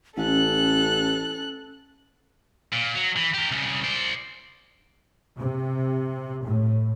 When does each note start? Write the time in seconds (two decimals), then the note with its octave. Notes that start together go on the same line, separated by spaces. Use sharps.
0.17 A1 C#4 A4 F#6
2.73 A#2
2.95 F#3
3.16 E3
3.34 G4 A#4
3.51 C2 C#3
3.84 C5 D5
5.38 C3
6.44 A2